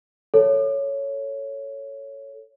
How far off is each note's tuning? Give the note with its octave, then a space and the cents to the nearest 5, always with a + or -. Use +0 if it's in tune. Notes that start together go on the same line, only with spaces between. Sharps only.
A4 +10 C#5 +0